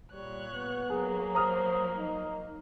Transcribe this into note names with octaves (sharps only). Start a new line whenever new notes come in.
A#2 G3 C#5 F#6
B3
F#3 A#3 G#4
C5 A#5 D#6 F6
D#4